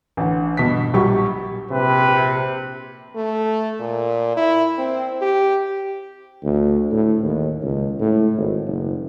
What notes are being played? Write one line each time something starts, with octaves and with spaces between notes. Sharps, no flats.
A1 D3
G2 B2 B6
A#1 F#3 G3 G4 C#6
A#1 C3 B4
A3
A#2
E4
C4
G4
D2
A2
D#2
C#2
A2
G#1
F#1